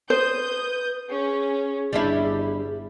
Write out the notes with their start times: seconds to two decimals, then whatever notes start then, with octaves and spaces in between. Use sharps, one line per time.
0.10 B4 C5 D#6 G6
1.10 C#4 G#4
1.93 G1 G3 D4 E4